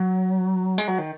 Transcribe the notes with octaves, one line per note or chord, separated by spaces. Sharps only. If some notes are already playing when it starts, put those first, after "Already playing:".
Already playing: F#3
G#3
F#3
D#3